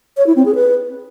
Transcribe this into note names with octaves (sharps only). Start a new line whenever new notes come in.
C#5
E4
C4
G#4
B4